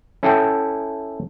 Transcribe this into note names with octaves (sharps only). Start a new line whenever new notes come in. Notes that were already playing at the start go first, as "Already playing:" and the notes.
C#4 E4 A4 E5 F#5 G5